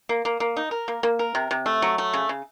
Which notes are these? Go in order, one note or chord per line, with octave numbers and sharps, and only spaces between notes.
A#3
A#3
A#3
D#4
A#4
A#3
A#3
A#4
C3
C3
A3
F#3
A3
C#3
C#3